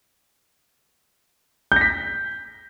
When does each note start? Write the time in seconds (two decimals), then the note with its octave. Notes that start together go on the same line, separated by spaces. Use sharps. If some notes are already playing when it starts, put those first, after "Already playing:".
1.72 G6
1.76 A#6
1.81 B6